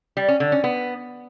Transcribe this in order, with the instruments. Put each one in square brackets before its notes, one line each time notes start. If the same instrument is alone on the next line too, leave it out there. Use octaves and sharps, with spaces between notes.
[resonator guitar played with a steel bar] G3
C#4
D3
C#4
B3